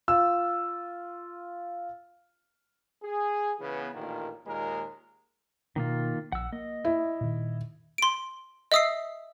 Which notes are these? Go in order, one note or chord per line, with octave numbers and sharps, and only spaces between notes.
F4 E6
G#4
C#3 E3 B3
A1 A#2 D#3 A#3
D#2 A#2 G#3 A#4
B2 D#3 A#3 F4
A#1 F#5 E6
A#3 D#5
E4
A#2 D#3
C6 D7
D#5 E5 D#6 E6 C7